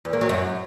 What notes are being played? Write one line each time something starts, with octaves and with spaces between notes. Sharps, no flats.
E2
A#3
F#3
F#2